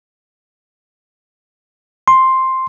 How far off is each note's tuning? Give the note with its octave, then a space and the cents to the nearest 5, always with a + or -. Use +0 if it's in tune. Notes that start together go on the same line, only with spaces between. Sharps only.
C6 +5